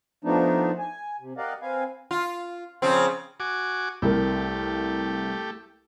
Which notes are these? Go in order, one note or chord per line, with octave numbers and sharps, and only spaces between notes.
F3 A3 B3 D4 D#4
G#5
C3
G4 A#4 D5 D#5 F5 F#5
C4 B4 F5 G#5
F4
C#3 F3 C4
F#4 G#5 D6
C2 A3 G4 A#4